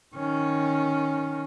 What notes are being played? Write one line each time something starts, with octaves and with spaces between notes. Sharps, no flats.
D#3 C#4